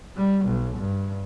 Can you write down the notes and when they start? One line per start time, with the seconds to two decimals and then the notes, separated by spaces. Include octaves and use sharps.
0.17 G3
0.46 B1
0.78 G2